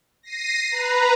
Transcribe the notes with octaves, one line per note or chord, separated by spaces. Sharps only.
A#6 C7 D#7
B4 A#5